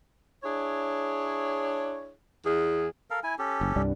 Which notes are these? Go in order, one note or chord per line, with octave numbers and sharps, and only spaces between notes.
D4 E4 G#4 C#5
E2 G#4
A4 A#4 F5
E4 G#5
C#4 G4 A4
F#1
C2 G2 D4